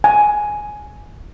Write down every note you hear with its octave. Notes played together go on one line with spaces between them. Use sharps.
G#5